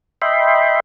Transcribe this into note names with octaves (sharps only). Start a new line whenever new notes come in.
D#5 E5 G5 B5 C6